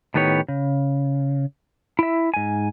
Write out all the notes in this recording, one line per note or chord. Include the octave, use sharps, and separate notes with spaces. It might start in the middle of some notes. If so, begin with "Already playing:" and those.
A2 D#3 B3 G4 C#5
C#3
E4 E5
G#2 G#5